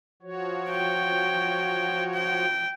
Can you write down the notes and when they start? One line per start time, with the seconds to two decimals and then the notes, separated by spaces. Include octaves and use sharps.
0.22 F3 F#4 C#5
0.70 G5
2.14 G5